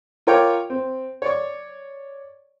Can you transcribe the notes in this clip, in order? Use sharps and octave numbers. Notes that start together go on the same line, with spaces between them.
F4 A#4 C#5 G5 D6
C4
C#5 D5 C#6